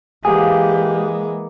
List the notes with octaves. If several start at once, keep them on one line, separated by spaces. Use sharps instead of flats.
E3 G#3 A#3 G4 G#4 B4 F#5